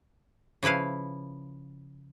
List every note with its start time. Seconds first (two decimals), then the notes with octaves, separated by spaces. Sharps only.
0.63 C#3 F3 E4 B4 F5